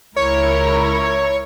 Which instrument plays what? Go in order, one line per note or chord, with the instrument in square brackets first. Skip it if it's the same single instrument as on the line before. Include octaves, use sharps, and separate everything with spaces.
[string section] C#2 E4 A#4 [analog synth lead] C#5